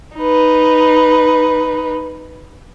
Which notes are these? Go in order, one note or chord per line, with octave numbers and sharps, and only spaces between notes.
D#4 B4